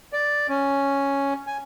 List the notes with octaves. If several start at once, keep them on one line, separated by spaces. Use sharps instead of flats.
D5
C#4
G#5